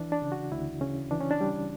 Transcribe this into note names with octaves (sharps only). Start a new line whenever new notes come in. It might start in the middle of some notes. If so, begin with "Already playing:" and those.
Already playing: E3 D4
D4
C#3
F#4
D2 E4
C#3 C#4
E3 D4
C#4
D4
G3